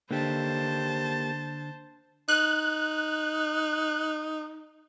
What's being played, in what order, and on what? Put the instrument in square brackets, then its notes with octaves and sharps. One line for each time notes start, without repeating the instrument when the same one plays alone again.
[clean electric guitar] D3 [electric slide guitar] A#3 G4 [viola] C5 A5
[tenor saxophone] D#4 [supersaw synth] F#6